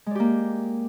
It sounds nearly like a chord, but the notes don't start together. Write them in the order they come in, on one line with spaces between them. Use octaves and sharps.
G#3 D5 G4 A#3